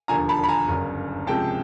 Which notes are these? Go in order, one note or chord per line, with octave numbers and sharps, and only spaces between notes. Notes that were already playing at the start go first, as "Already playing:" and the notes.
E1 D#2 D3 F3 G#5 A#5
A5 B5
B5
G#5 A#5
G1 F#2 C#3
C#2 C3 F3 G#3 G5 A5